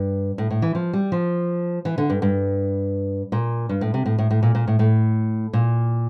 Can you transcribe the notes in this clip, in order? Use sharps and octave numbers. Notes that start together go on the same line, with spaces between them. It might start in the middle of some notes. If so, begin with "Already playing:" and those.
Already playing: G2
A2
A2
E3
F3
G3
F3
E3
D3
G2
G2
A#2
G2
A2
C3
A2
A2
A2
A#2
A#2
A2
A2
A#2